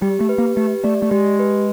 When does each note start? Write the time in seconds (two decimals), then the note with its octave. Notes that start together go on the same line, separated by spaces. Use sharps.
0.02 G3 G4
0.21 A3
0.29 B4
0.38 A#3
0.57 A3 G4
0.84 A3 D5
1.02 A3
1.11 G#3 G4
1.39 B4